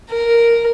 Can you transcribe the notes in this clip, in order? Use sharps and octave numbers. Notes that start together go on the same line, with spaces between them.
A#4